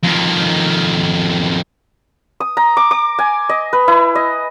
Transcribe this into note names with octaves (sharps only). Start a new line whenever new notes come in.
F2 D#3
D#6
A#5
D6
D6
G#5
D#5
B4
E4
D#5